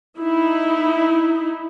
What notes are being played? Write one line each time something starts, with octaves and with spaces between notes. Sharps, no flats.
D#4 E4